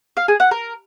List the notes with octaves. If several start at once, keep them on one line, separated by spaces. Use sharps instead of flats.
F5
G#4
F#5
A#4